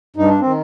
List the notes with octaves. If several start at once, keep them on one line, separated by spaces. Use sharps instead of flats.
G2 D#4
D4
D#3 C4